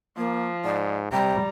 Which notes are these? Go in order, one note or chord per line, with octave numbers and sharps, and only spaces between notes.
F3 A#3
G#2 D5
C3 G3 G5 A#5